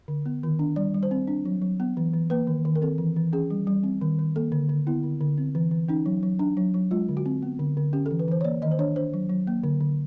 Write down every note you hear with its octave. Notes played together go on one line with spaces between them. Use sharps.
D3
B3
D#3
D4
G3 D5
G3
C5
C4
D4
F#3
F#3
B3
E3
E3
A#3 B4
D#3
D#3
A#4
C4 A4
E3
E3
C#4 G#4
G3
G3
C4
D#3
D#3
A#3 A4
D3
D3
B3 E4
D3
D3
C4
E3
E3
C#4 D#4
F#3
F#3
D4
F#3
F#3
G#3 F4
D3
F#4
C4
B3
D3
D3
C#4 G4
A4
E3
B4
E3 C5
C#5
A#3 D5
D#3 D#5
C5
D4 C#5
D4 C5
F#3
F#3
A#3
D3
D3